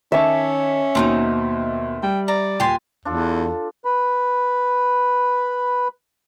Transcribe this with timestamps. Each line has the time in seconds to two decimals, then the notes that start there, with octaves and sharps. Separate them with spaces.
0.12 D#3 C#4 C#5 E5 A5 D6
0.95 D#2 B2 C4 D4 D#4
2.03 G3 G5
2.28 D5 A#5
2.60 D#1 G4 G#5 C6 A6
3.05 E2 D4 F4 A4
3.85 B4 B5